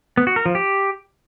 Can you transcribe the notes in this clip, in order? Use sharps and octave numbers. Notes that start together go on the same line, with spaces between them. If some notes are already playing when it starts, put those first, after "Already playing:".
B3
F#4
A#4
F3
G4